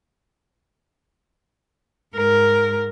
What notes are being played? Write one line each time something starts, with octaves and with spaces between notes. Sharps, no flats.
G#2 A#4